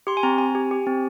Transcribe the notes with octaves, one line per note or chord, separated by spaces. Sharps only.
G4 C6
G#5
C4 A#5
C4 G#5
G4
G4
C4